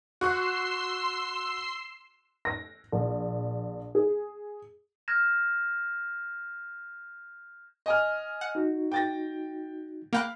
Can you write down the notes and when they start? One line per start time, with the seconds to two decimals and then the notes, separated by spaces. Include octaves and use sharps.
0.21 F#4 C6 C#6 E6 F#6 C7
2.45 A#6
2.92 A#1
3.95 G#4
5.08 F6 G6 G#6 A#6 E7
7.86 D#5 G#5 F6
8.41 F#5
8.55 D#4 F#4
8.92 G5 A6 A#6
10.13 A#3 F5 G5 B5 F#6